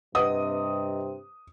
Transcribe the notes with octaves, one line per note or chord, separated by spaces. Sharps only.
G2 C3 B4 D#5 F#5 D#6